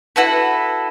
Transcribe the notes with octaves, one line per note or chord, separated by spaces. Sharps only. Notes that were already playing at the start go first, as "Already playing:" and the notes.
E4 F#4 A4 B4